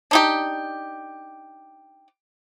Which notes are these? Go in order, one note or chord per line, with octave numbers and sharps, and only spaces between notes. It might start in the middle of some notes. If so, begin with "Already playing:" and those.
D4 D#4 G4